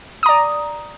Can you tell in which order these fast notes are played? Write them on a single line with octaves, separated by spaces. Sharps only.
D#6 A#5 D5